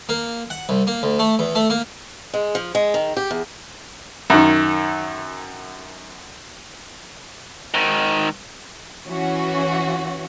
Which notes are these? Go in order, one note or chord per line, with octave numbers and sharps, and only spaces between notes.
A#3
F#5
C2
A#3
D2
A3
E2
A3
A#3
G#3
F3
G#3
D#3
G4
E2
F#2 D#3
G#2 D#3
E3 C#4 F#4